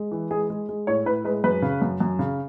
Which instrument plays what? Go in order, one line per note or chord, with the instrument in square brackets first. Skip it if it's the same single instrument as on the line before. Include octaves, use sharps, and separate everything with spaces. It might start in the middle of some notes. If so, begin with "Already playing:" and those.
Already playing: [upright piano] G#3
E3
G#3 G#4
G#3
G#3
A2 C#5
A2 B4
G#3 B4
F#2 B4
C#3
F#2
F#2
C#3